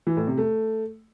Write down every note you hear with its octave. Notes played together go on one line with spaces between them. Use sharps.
E3
A2
C3
A3